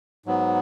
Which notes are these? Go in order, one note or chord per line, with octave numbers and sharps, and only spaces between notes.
G#2 F#3 B3